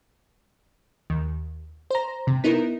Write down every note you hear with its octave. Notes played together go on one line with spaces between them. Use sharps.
D#2
C5 A#5
C3
B3 D#4 E4 A#4